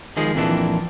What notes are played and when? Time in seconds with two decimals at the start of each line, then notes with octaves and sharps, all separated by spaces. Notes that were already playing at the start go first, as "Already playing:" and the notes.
0.17 D#3 F3 G#3 G#4
0.35 F2 A#2 E3 D4